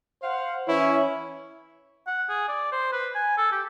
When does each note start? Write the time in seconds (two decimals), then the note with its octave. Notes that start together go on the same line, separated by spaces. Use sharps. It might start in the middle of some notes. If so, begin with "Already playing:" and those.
0.23 C5 F5 F#5
0.68 E3 C#4 E4 C#5
2.07 F#5
2.29 G#4
2.48 D5
2.72 C5
2.92 B4
3.15 G#5
3.37 A4
3.52 G4